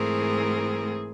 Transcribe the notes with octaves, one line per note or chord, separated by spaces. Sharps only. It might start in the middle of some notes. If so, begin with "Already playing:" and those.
Already playing: G#2 E3 A3 C4 G#4 A#4